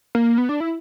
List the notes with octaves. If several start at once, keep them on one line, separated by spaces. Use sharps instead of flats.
A#3
B3
D4
E4